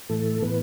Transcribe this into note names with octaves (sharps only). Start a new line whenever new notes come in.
A2 E3 A3 A4
A2 E3 B3 B4